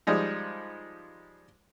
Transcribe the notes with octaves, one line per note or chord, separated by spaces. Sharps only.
F3 G3 G#3 D#4